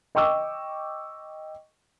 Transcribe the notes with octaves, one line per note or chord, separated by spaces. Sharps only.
D#5 G5 C#6 D6 E6